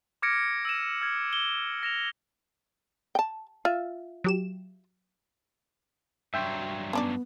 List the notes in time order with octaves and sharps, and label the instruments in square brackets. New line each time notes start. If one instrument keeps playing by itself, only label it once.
[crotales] D6 F6 G#6 A#6 C#7 D7
E6 D#7 E7
F6 G#6
G7
A#6 E7 F7
[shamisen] G5 A5
F4 E5
[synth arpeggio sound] F#3 G4 E7
[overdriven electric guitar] G2 F#3 [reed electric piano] E5 G5 C6
[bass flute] B3 [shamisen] C#4 D4 D5